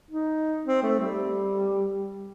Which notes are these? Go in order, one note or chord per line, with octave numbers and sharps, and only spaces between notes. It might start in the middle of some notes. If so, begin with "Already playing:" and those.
D#4
C4
A3
G3